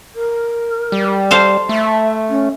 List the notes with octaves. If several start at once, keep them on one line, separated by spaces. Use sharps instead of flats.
A#4
G3
A4 C5 F5
A3 E5
C#4